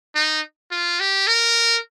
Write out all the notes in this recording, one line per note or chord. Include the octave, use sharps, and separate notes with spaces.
D#4
F4
G4
A#4